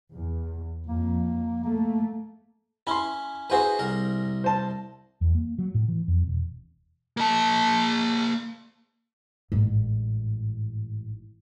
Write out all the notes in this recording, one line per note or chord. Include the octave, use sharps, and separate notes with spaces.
E2
F2 A#3
A3 A#3
C#4 E4 B5 C6
E4 F#4 G#4 B4 C5 G#5
C2 A#4
C5 A5
E2
A#3
F#3
A2
E3
F2
E1
A#3 A5
A1 G#2